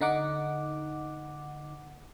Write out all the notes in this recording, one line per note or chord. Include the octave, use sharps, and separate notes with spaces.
D3 D#4 F#5 D6